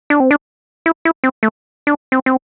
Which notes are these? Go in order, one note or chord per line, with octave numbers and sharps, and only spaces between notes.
D4
C4
D4
E4
E4
C4
A3
D4
C4
C4